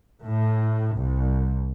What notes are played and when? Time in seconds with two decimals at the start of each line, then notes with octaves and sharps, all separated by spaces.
0.22 A2
0.97 C2